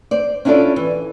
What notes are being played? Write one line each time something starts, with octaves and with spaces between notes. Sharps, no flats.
C5 D5
C#4 D4 E4 F4 A4 D5
E3